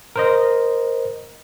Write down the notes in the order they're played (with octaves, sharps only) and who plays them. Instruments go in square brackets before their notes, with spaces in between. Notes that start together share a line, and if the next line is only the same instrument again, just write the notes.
[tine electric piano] A#4 C5 D#5